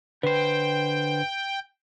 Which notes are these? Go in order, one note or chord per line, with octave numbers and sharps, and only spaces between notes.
D3 B4 C5 G5